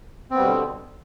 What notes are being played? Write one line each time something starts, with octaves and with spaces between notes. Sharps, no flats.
B2 D3 G3 B3 C4